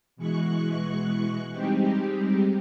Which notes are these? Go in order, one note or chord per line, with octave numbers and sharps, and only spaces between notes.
B2 E3 G#3 C#6 F#6
G3 G#3 C4 D#4 G4